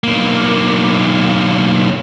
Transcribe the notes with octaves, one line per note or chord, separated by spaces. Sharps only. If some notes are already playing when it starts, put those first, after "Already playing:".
B1 A#3